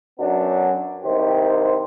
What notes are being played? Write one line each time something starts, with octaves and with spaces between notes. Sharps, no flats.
F#2 F#3 B3 D4
C2 D#3 G4 C5